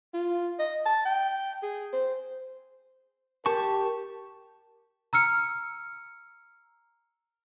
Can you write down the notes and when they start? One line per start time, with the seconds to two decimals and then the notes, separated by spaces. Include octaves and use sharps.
0.14 F4
0.59 D#5
0.86 A5
1.05 G5
1.63 G#4
1.93 C5
3.46 G4 A#4 A5 C#6
5.13 A#5 E6 F6 C#7